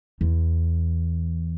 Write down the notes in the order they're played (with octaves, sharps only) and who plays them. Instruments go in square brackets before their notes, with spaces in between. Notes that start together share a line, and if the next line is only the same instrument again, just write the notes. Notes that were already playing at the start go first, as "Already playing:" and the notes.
[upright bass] E2